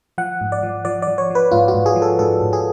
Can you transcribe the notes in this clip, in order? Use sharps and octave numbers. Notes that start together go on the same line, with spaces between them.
F3 F#5
G#2
D5
F3
F3 D5
D5
F3
C#5
F3 B4
G#2 F4
F#4
G#2
G#4
F3
A4
G#2 A4
G#2
G#4